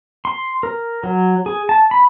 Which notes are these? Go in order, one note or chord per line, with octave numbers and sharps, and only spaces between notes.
C6
A#4
F#3
G#4
A5
B5